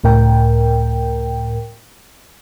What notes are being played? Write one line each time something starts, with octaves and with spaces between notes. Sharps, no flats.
C#2 A2 A#4 G5